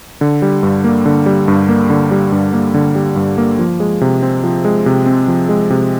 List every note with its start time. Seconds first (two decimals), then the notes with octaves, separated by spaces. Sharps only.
0.21 D3
0.42 G3
0.63 G2
0.84 A#3
1.06 D3
1.26 G3
1.48 G2
1.69 A#3
1.90 D3
2.11 G3
2.32 G2
2.53 A#3
2.74 D3
2.95 G3
3.16 G2
3.38 A#3
3.59 F3
3.80 G#3
4.01 C3
4.23 C4
4.44 F3
4.65 G#3
4.86 C3
5.06 C4
5.28 F3
5.49 G#3
5.70 C3